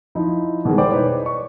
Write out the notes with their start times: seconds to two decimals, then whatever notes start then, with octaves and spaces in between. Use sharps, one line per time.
0.15 F3 D#4 E4
0.65 B2 D#3 E3 G3 G#3
0.78 E4 A#4 C5 D5 G5 D6
0.91 D#4 B4 C#5
1.25 D5 C#6